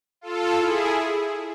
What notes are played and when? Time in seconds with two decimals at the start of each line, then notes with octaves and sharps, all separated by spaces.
0.21 F4 A4
0.57 E4 G#4